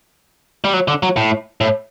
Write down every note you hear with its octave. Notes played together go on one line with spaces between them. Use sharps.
G3
F#3
D3
F#3
A2
A2